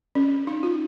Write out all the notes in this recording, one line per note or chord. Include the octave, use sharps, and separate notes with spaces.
C#4
D#4
F4